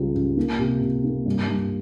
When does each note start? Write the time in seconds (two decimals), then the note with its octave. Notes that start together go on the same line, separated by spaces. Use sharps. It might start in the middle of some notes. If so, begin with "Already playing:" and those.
Already playing: C#2 C#3 G3
0.15 C#2
0.37 A#3
0.59 C3
0.81 C3
1.04 A#3
1.26 G2
1.48 G2